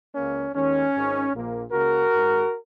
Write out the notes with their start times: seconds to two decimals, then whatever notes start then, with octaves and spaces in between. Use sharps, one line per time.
0.14 C#2 C#3 A#3 C#4
0.54 D#2 D#3 G#3 C#4
0.93 G#1 G#2 D#3
1.32 A#1 A#2 A#3
1.71 C#2 C#3 A#3 F#4 A#4
2.11 G#1 G#2 G#3